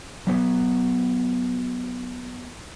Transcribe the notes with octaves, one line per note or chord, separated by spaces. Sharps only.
F#3 B3